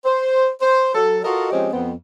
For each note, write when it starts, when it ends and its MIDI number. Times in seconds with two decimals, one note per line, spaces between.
0.05 0.49 72
0.61 0.91 72
0.94 1.19 54
0.94 1.19 69
1.24 1.48 65
1.24 1.48 66
1.24 1.48 69
1.24 1.48 70
1.24 1.48 75
1.52 1.70 53
1.52 1.70 56
1.52 1.70 60
1.52 1.70 61
1.52 1.70 67
1.52 1.70 75
1.73 1.93 41
1.73 1.93 59
1.73 1.93 60